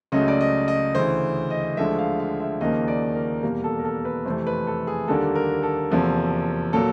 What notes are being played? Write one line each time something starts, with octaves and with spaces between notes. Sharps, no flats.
C#2 C#3 F#3 A3 D#5
D5
D#5
D#5
D2 C#3 E3 C5
D#5
D2 D3 F3 G#3 E5
F5
F5
E5
D#2 C#3 F3 A#3 D#5
D5
A#4
E2 B2 G3 A#3
A4
A#4
A4
B4
F2 C3 E3 A3 C5
B4
A4
G#4
D#2 D3 G3 A#3 A4
A#4
A4
E2 C3 F3 A#3
A#2 F#3 A#3 A4